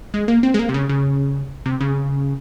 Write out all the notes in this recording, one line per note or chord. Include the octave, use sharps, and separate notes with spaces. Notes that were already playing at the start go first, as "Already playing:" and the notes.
G#3
A#3
C4
G#3
A#3
C3
C#3
C#3
C3
C#3